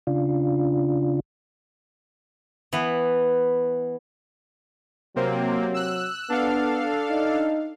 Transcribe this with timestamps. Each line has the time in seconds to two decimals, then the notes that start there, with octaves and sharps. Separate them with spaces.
0.07 C#3 D4 F4
2.73 E3 B3
5.16 C3 F#3 A#3 C4
5.74 E6 F#6
6.30 B3 D4 A4 F5
7.10 D#4